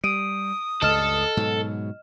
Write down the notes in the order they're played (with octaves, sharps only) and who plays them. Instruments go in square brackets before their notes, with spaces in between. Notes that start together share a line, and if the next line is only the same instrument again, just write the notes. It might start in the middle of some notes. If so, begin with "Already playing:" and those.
[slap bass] G3 [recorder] D#6 [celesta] D7 D#7
[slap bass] C#2 G2 [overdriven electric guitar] A4 [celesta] D#5 F6 E7
[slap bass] G#2 B2 F#3